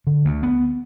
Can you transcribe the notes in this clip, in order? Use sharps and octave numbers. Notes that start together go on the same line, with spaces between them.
D3
D2
B3